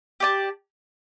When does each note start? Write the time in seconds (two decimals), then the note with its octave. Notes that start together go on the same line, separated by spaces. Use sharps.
0.20 G4 D5 A5